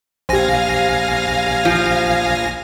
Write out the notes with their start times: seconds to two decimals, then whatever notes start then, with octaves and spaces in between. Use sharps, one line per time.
0.29 A#1 G4 C5 F5 G#5 A#6
1.65 F3